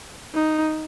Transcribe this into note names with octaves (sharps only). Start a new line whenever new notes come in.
D#4